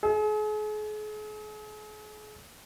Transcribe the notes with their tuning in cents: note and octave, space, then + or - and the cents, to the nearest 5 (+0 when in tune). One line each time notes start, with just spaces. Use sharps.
G#4 +40